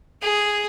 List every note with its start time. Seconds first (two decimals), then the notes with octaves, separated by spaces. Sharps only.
0.22 G#4